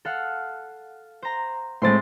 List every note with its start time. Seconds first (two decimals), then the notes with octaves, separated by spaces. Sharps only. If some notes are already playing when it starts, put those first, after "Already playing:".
0.05 A4 F5 F#5
1.22 C5 A#5
1.82 A2 G#3 A3 C4 C6 A6